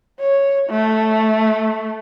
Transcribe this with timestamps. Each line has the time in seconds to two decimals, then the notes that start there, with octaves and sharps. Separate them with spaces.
0.20 C#5
0.70 A3